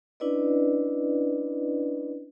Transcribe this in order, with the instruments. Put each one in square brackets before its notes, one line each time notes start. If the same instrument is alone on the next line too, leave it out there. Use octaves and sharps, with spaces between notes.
[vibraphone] C#4 D4 E4 B4 D5 D#5